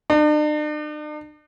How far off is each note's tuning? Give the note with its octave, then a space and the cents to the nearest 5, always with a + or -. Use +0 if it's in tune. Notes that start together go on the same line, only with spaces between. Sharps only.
D4 +45